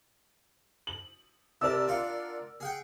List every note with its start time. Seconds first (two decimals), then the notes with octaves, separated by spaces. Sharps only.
0.87 F#7
1.61 C3 A#4 D5 A5 E6
1.88 D4 F4 F#5
2.60 G#4 F#5 G5